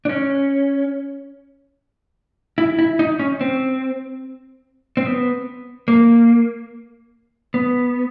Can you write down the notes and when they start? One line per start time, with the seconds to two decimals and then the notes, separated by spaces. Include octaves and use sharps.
0.05 D4
0.09 C#4
2.58 E4
2.79 E4
2.99 D#4
3.19 C#4
3.41 C4
4.97 C4
5.06 B3
5.88 A#3
7.54 B3